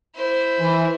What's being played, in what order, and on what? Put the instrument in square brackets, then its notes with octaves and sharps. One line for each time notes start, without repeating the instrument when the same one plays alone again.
[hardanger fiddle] E4 C5
[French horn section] E3